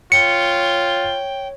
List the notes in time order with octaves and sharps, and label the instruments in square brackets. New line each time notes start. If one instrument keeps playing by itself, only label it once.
[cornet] F4 [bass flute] C#5 [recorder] G5 [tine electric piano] C#7